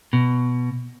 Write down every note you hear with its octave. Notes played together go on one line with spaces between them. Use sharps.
B2